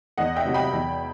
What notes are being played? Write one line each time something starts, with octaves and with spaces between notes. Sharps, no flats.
E2 D#5 F#5
E5 G5
C3 F#3
G5 B5
E2